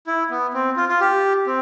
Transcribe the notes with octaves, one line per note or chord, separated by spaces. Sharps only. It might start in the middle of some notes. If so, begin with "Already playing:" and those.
E4
B3
C4
F4
F4
G4
C4